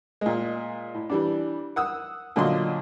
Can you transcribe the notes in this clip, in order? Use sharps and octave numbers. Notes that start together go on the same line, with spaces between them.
A#2 G#3
A2
E3 G3 D4
F#5 D#6 E6
A#2 D3 F#3 F4 D#5 C6